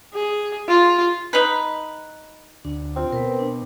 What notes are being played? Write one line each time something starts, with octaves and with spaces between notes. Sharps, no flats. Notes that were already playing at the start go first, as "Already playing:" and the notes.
G#4
F4
D#4 B4
D2 D4
C4 F4
B2 A#4 B4
D4